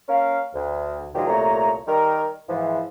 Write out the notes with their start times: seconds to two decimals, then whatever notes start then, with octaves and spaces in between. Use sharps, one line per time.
0.09 A#3 C#4 A#4 F5
0.54 D2
1.14 B2 D#3 F3 G#3 D4 G4
1.27 C2 A#2 A3 C#5 A#5
1.87 D#3 G3 G4 A#4
2.48 G#2 E3 F3